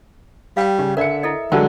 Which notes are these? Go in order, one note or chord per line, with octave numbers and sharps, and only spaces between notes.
G3 F5 G5
C#3
D3 A#4 D5 E5 C#7
E4 A4 D#5
D3 E3 F#3 G#3 A#4 G5 A5